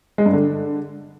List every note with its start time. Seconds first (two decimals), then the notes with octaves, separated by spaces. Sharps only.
0.18 G#3
0.26 G2
0.33 D3